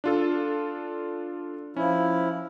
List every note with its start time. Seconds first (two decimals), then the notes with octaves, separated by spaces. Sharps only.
0.04 D4 F4 A4
1.76 F3 C#4 E4